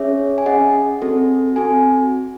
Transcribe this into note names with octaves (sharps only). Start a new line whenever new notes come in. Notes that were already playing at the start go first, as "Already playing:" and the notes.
Already playing: C#4 G#4 C#5 E5
G#5
C#4 G#4 D#5 F#5
C4 F#4 A4
C4 F#4 A4 G#5